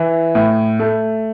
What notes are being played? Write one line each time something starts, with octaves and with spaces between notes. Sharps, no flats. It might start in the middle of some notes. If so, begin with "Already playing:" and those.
Already playing: E3
A2
A3